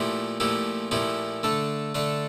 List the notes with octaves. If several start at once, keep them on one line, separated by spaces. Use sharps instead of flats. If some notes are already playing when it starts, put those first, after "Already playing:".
Already playing: A#2 F3 A3 E4 G4
A#2 F3 A3 E4 G4
A#2 F3 A3 E4 G4
D3 A3 D4 A4
D3 A3 D4 A4